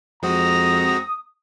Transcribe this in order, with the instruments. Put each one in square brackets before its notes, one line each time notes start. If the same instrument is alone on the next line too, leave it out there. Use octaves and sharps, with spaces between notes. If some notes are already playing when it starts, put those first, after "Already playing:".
[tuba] F2 [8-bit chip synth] G#3 C4 F#4 [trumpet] A#5 [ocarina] D#6